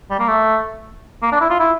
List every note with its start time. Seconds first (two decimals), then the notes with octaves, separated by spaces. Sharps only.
0.10 G3
0.19 A#3
0.28 A3
1.22 A#3
1.32 D4
1.41 E4
1.50 F4
1.60 E4